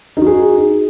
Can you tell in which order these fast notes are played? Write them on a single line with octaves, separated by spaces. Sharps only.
D#4 F#4 G#4